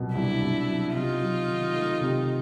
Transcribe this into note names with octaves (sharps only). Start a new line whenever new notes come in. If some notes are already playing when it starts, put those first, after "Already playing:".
Already playing: C2 B2 F#3
C2 D4 E4
C2
F#3
C3 D#4 F4
F#3
D#3
A3
C3